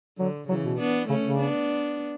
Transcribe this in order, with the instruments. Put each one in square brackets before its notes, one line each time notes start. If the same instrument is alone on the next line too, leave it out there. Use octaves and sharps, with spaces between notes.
[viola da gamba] D3 [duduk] F#3
[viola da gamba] C#3 E3 [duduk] F#3
[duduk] B2
[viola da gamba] B3 D4
[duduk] C#3 [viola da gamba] A3 C#4
[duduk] C#3
[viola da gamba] B3 D4